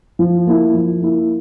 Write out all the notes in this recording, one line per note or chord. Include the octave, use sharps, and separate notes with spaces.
F3
A#3 E4
F3
A#3 E4